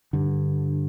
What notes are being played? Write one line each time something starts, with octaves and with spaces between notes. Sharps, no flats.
G2 D3